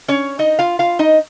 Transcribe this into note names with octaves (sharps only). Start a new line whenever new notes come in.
C#4 C#5
D#4 D#5
F4 F5
F4 F5
D#4 D#5